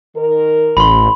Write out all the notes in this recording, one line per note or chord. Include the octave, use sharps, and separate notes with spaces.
D#3 A#4
A1 B5 C6